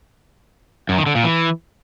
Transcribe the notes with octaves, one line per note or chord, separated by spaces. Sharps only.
F#2
D#3
D3
A#2
E3